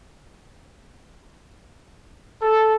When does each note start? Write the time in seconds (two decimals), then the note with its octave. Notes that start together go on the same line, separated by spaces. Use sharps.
2.42 A4